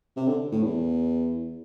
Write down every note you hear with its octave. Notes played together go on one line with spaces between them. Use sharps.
C3
D3
A2
E2